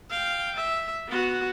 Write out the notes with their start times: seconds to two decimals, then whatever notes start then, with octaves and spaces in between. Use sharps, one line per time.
0.10 F5 G5
0.56 E5
1.08 B3 F#4